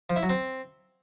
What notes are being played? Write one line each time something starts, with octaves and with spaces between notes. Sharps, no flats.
F3
E4
F#3
C4